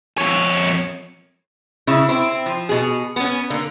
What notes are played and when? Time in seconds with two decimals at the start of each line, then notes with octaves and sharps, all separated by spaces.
0.18 F2 C#5
1.87 C#3 E4
2.09 C4 E4
2.46 F3
2.69 B2 G#4
3.16 B3 C#4
3.50 D3 A#3